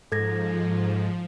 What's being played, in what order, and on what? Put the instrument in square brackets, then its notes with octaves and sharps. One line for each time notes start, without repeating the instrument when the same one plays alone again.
[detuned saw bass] G#2 [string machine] F3 [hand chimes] A4 G#6 A#6